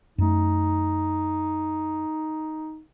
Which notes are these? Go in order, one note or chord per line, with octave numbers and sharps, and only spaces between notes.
F#2 A3 D#4